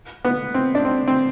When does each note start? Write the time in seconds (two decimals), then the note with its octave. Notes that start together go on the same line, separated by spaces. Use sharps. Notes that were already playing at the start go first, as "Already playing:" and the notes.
0.25 B3
0.54 C4
0.75 D4
0.85 C4
1.08 C4